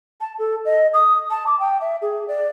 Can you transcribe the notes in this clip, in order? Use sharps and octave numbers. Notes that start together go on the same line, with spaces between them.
A5
A4
D#5
D#6
A5
D6
G5
E5
G#4
D5